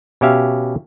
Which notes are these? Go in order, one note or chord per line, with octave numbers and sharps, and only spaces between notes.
B2 C#4 G4 E5 F5